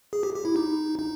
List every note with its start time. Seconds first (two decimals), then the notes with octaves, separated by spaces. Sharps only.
0.13 G#4
0.23 G4
0.35 G4
0.45 E4
0.56 D#4
0.99 D#4